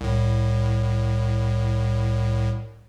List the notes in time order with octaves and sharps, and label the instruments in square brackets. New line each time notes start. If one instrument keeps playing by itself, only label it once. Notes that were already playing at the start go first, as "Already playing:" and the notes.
[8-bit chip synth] C2 A2